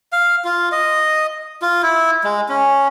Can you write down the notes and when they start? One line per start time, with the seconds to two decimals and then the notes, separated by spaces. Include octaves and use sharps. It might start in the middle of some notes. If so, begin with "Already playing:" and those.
0.12 F5
0.45 F4
0.72 D#5
1.62 F4
1.83 E4
2.24 G#3
2.49 C#4